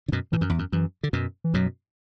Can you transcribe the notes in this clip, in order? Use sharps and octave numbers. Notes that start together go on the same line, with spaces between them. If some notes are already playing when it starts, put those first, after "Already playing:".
D3
F#2 B2
A2 E3
F#2
E2
F#2
F#2 E3
D3
F#2 B2
E3
F#2 B2 F#3